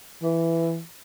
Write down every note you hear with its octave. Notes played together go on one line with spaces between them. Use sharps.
E3